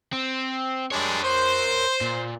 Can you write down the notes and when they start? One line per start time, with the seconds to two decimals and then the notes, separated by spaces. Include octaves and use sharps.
0.13 C4
0.91 G3 G#3 D4 A#4 C#5
1.24 C5
2.01 A#2